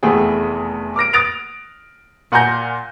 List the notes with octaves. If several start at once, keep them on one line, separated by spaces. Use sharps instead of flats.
F1 E2 A3 B3 G#4 G5
D6 F6 A#6 D7
D#6 F#6 A6 A#6 D7 F7
A#2 F#5 G#5 A#5 G6 A#6